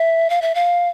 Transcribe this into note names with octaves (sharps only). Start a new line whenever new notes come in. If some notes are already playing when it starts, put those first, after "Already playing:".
Already playing: E5
F5
E5
F5